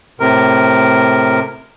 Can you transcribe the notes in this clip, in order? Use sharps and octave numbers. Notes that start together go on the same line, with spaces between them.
A2 C3 A#4